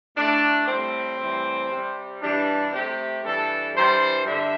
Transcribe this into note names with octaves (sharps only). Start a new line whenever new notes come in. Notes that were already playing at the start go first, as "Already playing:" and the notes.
A2 A3 D4
A2 G3 C4
A2 E3 G3
C3 G3
G2 E3 G3 D4
C3 A3 G4
G2 E3 G3 A4
G2 E3 G3 C5
G2 D3 G3 E5